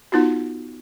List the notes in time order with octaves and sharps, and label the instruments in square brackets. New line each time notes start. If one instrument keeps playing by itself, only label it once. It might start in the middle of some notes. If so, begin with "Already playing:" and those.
[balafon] B3 D#4 F4 F#4